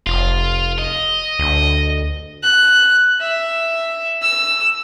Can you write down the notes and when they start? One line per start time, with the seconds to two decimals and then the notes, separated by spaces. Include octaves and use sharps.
0.07 F1 F4
0.79 D#5
1.39 D2
2.43 F#6
3.21 E5
4.22 E6